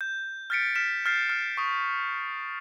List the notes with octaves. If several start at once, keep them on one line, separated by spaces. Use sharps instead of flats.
G6
F6 G6 A6 B6 C#7 D7
F6 B6 E7
F6 G6 A6 C7
F6
C#6 D#6